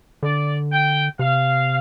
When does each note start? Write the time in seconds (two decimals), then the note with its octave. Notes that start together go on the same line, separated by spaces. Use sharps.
0.23 D3 D5
0.72 G5
1.19 C3 F5